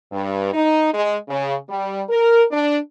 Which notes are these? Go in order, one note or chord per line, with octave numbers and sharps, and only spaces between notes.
G2
D#4
G#3
C#3
G3
A#4
D4